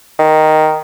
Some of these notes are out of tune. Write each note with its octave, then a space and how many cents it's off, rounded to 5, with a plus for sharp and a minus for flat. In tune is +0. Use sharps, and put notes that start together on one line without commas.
D#3 +0